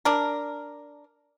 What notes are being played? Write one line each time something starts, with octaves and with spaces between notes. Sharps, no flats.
D4 A#4